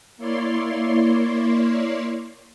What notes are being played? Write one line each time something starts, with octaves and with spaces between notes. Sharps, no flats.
A#3 E4 C#5 D5 C6